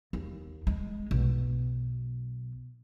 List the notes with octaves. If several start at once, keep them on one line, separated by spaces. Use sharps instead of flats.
D#2
G#3
B1